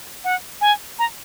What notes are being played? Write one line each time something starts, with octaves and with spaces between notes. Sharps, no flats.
F#5
G#5
A#5